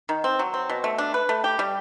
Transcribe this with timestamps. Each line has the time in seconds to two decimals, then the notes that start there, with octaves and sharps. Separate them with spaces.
0.09 D#3
0.24 C4
0.39 F#3
0.54 C4
0.69 B2
0.84 A3
0.98 D4
1.14 B4
1.29 A3
1.44 G4
1.59 G3